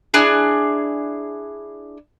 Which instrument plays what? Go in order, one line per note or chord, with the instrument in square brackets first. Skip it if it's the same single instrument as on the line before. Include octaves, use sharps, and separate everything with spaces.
[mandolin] D4 E4 G#4